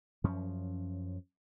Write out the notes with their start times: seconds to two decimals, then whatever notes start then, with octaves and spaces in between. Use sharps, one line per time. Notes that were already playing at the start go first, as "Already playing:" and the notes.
0.24 F#2 F3 C#4